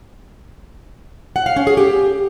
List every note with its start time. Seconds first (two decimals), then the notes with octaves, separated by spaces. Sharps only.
1.36 F#5
1.46 F5
1.56 C#4
1.67 G#4
1.77 G4